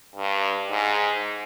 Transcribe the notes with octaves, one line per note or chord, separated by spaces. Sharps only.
G2
G#2